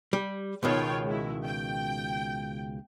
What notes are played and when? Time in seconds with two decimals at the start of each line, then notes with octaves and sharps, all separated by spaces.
0.13 G3
0.63 C#2 B2 D#3 F4 C#5 G5
1.04 G#3 E4
1.46 G5